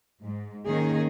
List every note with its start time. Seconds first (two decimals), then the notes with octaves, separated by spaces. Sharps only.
0.23 G#2
0.66 D#3 A#3 C#4 D#4 G#4